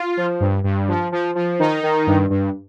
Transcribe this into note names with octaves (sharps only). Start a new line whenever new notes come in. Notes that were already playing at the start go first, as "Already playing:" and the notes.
Already playing: F4
F3
G2
G2
F3
F3
F3
D#3 D#4
D#3
G2
G2